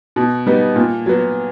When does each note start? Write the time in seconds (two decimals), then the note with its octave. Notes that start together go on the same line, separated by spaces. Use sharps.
0.16 B2
0.46 G3 B3 D#4
0.76 A#2
1.06 F#3 B3